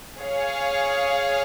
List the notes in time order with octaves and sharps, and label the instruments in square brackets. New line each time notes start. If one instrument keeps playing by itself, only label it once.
[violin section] G#4 C#5 F5